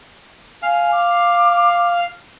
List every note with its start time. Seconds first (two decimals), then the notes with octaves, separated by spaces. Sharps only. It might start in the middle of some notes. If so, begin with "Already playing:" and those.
0.62 F5 G#5
0.92 D6